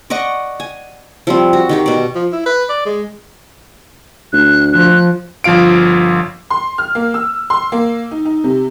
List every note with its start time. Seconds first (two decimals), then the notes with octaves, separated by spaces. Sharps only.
0.10 D5 D#5 F#5 C#6
0.60 G#5
1.27 F3 G3 C4
1.53 F#4
1.69 D#3 G4 C#5
1.86 B2 D5
2.15 F3
2.32 E4
2.46 B4
2.69 D5
2.85 G#3
4.33 D2 F#6
4.73 F3 F#6
5.44 G1 F3 F4 F5 D7
6.50 C6
6.78 F6
6.95 A#3
7.14 E6
7.50 C6
7.72 A#3
8.11 D#4
8.25 D#4
8.44 C3